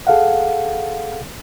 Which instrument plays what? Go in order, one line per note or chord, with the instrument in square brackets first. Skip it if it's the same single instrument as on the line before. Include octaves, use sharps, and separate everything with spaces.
[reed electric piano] G#4 A4 F5 F#5